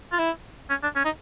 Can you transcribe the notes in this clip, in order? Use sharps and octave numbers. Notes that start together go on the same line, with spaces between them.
F4
E4
C#4
D4
C#4
D#4